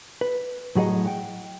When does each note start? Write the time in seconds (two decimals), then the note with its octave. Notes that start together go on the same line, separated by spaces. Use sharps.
0.21 B4
0.75 A2 F#3 G#4 D#5 F#5
1.06 F#5 G5